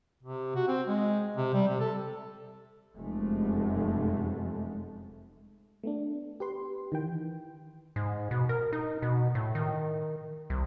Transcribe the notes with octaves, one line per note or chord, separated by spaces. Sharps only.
C3
F#4
C4
G#3
C3
G3
C3
A4
F1 F#2 G#3 A3
A3 B3 D4
G4 B4 C6
D#3 E3 G5
G#2
B2
A#4
D#4
B2
A2
D#3
C2